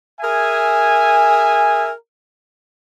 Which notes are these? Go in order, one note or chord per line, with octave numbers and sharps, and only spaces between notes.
G#4 A#4 E5 G#5